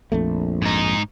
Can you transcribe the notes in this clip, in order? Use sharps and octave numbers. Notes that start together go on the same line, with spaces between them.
A#1 F2 A3
G#2 D#4